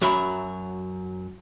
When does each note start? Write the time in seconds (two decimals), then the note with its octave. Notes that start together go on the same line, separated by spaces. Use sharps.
0.02 F#2 F#3 E5 B5